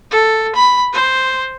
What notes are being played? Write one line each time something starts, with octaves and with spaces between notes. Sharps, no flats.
A4
B5
C5